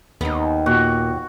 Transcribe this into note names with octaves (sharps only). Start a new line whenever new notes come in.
D#2 B3 D#4
A#2 F#4